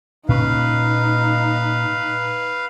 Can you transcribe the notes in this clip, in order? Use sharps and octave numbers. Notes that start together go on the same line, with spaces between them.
A#2 C#4 D#4 B4 F5